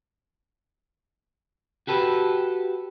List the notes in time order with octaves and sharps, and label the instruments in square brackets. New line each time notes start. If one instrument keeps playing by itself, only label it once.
[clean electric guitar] F#4 G4 A4 B4